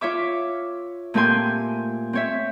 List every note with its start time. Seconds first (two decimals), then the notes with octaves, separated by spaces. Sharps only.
0.01 F4 C#5 E5 D6
1.14 A#2 A3 C4 G4 G#5 C6
2.13 C4 C#5 E5